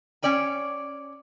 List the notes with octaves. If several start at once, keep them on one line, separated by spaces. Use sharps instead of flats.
C#4 C#5 D5 G5 G#5